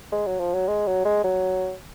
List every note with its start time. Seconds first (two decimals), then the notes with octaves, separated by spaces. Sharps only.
0.12 G#3
0.26 F#3
0.40 F3
0.54 F#3
0.68 G#3
0.87 F#3
1.05 G#3
1.24 F#3